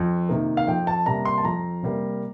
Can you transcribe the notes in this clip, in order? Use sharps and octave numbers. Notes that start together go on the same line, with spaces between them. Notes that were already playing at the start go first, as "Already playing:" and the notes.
Already playing: F2
C3 D#3 A#3
F5
F2 G5
A5
C3 G3 A#3 A#5
C6
A5
F2 A#5
C3 G3 A#3